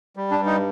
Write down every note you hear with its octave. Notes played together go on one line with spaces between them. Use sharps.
G3
D4
G2
D#4